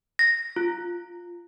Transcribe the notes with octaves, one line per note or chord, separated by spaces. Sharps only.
A#6
F4